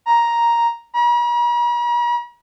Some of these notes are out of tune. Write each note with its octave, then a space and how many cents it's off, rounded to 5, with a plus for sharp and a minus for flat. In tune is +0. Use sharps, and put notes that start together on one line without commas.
A#5 +5
A#5 +45